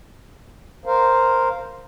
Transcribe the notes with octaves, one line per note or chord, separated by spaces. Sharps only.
A#4 C5 F5